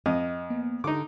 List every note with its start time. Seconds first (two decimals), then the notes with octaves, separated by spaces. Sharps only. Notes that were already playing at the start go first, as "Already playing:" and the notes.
0.06 F2 D#5
0.50 A#3 B3
0.84 D3 D#4 G4 G#4 D6